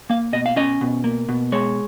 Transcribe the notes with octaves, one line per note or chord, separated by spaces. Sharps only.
A#3 F5
B2 D#5
F5
C#4 D#5
B2
A#3
B2
G#3 C#5